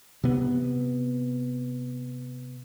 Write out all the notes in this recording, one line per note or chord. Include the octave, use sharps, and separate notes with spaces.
C3 B3